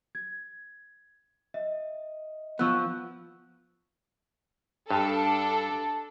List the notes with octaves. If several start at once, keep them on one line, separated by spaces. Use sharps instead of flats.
G#6
D#5 E5
F3 B3 C#6 E6 F#6
G2 D4 A4